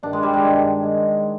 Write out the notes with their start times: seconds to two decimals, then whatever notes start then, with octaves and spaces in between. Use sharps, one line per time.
0.03 G2 D#3 D4
0.13 G#3
0.23 G3
0.33 G#3
0.44 G2 D#3
0.84 D#3